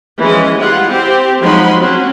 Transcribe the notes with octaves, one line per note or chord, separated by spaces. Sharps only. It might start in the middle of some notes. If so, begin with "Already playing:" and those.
E3 F3 G#3 C#4 D#5
G3 G#3 E4 F4 F#5
C4 G4 C5
F3 F#3 G#3 D#4 B5 C6
F#3 C4 C#4